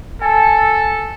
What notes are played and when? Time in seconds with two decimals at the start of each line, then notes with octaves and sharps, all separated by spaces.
0.22 A4 G#5 A5